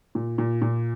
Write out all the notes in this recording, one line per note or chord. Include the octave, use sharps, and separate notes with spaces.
A#2
A#2
A#2